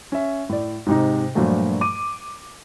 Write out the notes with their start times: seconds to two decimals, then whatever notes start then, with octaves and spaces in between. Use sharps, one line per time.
0.12 C#4 E5
0.49 A2 D5
0.86 G#2 C3 D#4
1.35 G2 A#2 F3 F#3 A3
1.81 D6 D#7